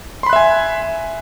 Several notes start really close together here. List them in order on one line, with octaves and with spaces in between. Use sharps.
C6 B5 F#6 E5 G#5